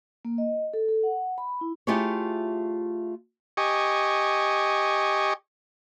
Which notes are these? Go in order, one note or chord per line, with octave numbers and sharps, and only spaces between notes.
A#3
D#5
A4
A4
F#5
B5
E4
A3 E4 F4 G4 G#4 C#5
G4 D#5 G#5 C#6